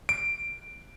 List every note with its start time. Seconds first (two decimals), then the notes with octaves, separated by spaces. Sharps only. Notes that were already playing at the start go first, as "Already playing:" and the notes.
0.09 D7